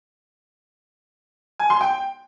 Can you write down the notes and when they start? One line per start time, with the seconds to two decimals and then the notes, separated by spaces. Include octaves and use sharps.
1.59 G#5
1.70 C6
1.81 G5